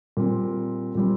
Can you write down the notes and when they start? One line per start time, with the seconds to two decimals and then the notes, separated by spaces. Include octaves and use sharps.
0.17 A#2 G3 C4
0.95 A#2 G3 C4